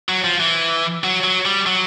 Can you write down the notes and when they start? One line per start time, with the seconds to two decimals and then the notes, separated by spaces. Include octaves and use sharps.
0.09 F#3
0.24 F3
0.40 E3
1.04 F#3
1.24 F#3
1.45 G3
1.67 F#3